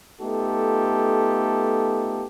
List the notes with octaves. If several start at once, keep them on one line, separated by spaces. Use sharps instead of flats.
A3 B3 D#4 F4 G4 A4